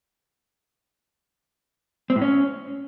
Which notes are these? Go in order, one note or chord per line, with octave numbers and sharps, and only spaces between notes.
C4
A2
C#4